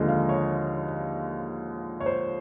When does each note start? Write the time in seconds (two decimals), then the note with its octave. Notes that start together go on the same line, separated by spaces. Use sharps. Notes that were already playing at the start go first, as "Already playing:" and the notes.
Already playing: D#2 D3 F3 G#3 D#5
0.08 F5
0.29 C#5
2.00 C#5
2.06 C5